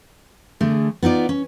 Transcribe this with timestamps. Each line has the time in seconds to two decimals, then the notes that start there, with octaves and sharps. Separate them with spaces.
0.60 D3 A3 G#4
1.03 B3 D#4 F4 D5
1.29 C#4